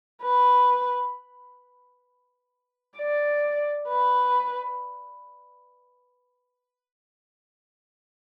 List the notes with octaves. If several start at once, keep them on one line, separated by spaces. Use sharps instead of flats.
B4
D5
B4